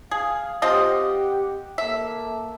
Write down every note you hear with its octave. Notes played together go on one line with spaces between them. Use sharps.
G#4 F5
C4 F4 G4 D#5 F#5
A#3 A4 E5